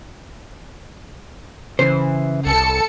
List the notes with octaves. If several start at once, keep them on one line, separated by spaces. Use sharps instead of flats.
C#3 E3 C5
C2 A4 C#7